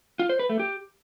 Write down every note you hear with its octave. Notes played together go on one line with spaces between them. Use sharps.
F4
C5
B4
A3
G4